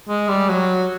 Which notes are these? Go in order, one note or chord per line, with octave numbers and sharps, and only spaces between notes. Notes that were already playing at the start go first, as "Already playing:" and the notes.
G#3
G3
F#3